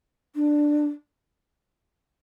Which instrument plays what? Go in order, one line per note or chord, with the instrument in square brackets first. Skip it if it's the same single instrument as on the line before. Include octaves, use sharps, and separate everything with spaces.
[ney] D4